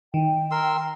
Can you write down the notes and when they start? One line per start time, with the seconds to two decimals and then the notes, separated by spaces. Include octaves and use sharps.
0.14 D#3 G5
0.51 A#4 C6 E6